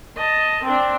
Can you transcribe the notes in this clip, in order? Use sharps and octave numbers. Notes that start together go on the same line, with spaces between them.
D#5 A5
C4 D4